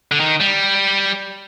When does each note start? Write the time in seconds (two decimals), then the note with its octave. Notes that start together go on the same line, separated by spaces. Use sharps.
0.12 D3
0.20 D#3
0.40 G3